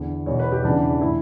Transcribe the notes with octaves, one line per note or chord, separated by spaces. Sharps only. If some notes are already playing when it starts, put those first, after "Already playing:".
Already playing: E2 D3
E2 B2 C#5
B4
G4
E2 C#3 E3 D4
A2 E3 E4